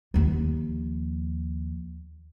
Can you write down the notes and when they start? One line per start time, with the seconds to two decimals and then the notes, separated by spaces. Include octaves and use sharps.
0.14 D#2 F3